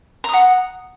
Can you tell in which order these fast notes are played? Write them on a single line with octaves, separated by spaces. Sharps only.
A#5 D#6 F#5